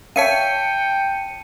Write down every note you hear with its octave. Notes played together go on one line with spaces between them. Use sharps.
C#5 E5 F5 G5 A5 C#7 D#7